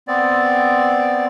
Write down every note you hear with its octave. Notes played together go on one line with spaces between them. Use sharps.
B3 C4 D5